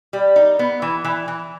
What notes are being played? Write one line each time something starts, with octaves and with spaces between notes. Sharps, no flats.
G3
D#4
B3
E3
E3
E3